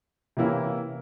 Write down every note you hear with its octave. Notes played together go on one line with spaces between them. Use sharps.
C3 E3 A#3 C#4 E4